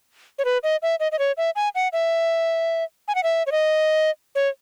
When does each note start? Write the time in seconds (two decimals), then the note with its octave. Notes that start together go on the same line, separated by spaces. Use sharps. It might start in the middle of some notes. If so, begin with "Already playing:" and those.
0.39 C#5
0.45 B4
0.63 D#5
0.82 E5
1.00 D#5
1.12 D#5
1.19 C#5
1.37 E5
1.56 G#5
1.75 F#5
1.93 E5
3.08 G#5
3.15 F#5
3.23 E5
3.47 C#5
3.52 D#5
4.35 C#5